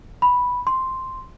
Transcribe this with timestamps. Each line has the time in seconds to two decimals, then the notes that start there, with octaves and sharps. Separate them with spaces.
0.22 B5
0.67 C6